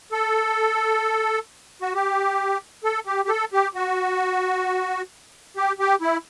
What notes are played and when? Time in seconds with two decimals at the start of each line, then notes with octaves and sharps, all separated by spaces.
0.12 A4
1.82 F#4
1.94 G4
2.84 A4
3.07 G4
3.25 G4
3.29 A4
3.53 G4
3.75 F#4
5.57 G4
5.79 G4
6.01 E4